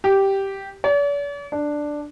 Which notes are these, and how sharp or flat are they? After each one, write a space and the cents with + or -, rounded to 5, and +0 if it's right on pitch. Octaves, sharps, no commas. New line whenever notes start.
G4 -5
D5 -45
D4 +5